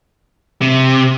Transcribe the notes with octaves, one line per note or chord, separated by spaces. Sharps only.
C3